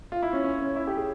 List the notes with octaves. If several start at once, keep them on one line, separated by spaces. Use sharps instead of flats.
F4
E4
C#4
C#4
C#4
E4
G4
G#4